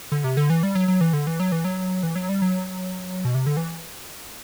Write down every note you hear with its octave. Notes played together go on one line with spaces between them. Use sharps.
D3
C3
D3
E3
G3
F#3
F#3
E3
D3
E3
F#3
E3
F#3
E3
F#3
G3
F#3
B2
C3
D3
E3